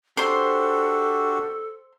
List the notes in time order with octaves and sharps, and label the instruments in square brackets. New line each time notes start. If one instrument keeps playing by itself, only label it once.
[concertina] D4 F#4 G4 [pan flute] A4 [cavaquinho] C5 C6